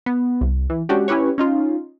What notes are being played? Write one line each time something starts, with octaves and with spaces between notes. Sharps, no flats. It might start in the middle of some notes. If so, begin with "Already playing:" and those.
B3
C2
E3
G#3 C#4 D4 F#4 G4
C#4 E4 G4 B4 C#5
C#4 D#4 F4